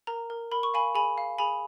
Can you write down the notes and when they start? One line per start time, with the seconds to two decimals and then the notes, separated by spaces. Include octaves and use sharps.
0.07 A#4 A#5
0.30 A#4
0.52 A#4 B5
0.63 C#6
0.74 F5 G#5 B5
0.95 G#4 G#5 B5
1.18 F5
1.39 G#4 G#5 B5